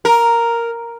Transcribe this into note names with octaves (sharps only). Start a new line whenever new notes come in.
A#4